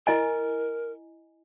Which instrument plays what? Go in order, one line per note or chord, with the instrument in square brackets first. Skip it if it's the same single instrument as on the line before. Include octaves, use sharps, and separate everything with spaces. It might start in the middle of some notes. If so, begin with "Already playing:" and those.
[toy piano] E4 D#5 G#5 [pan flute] A#4